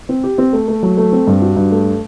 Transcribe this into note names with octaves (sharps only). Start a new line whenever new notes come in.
C4
G4
C4
A3
A3
F#3
A3
C4
G2
F#4
G2
A3